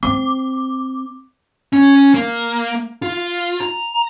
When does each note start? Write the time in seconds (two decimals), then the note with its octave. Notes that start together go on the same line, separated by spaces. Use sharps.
0.03 C4 D6
1.73 C#4
2.14 A#3
3.02 F4
3.61 A#5